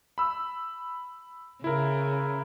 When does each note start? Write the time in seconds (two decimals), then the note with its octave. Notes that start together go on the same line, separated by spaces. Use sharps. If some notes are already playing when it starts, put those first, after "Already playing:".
0.18 B5 E6
1.64 C#3 E4 A#4